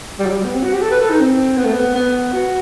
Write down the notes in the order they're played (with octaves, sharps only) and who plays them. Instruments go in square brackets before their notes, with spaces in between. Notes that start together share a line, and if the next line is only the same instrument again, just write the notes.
[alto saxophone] G3
F#3
G3
B3
C4
F#4
G4
A4
B4
A4
D#4
C4
B3
A3
B3
B3
F#4